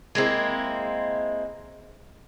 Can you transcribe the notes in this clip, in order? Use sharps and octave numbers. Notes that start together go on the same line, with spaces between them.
G#3 A#3 C4 E4